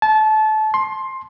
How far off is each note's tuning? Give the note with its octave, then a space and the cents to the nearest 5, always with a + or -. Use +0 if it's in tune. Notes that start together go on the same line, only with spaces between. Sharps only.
A5 -25
C6 +15